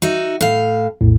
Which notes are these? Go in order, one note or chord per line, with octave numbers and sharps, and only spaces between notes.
D#4 F#4 E5
A2 F5
A#1 E2 A2